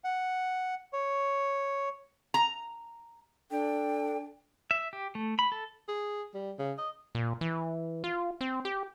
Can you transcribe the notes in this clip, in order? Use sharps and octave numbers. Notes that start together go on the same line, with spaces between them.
F#5
C#5
A#5
D4 A4 G5
E5
G4
A3
B5
A4
G#4
G3
C#3
D#5
A#2
E3
F4
C4
G4